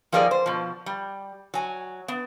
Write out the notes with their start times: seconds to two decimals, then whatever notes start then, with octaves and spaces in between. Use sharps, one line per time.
0.12 F3 G3 A#3 D#4 G#4 D5
0.31 C5
0.46 B2 F3
0.86 G3
1.54 F#3 G#5
2.08 B3